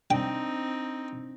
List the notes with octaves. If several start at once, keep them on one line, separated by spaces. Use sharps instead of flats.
C4 D4 D#4 G5